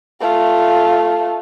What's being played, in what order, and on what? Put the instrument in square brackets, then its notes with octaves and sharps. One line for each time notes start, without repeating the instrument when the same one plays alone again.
[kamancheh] A3 F4